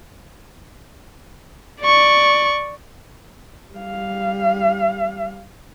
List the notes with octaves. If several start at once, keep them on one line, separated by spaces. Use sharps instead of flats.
D5 C#6
G3 F5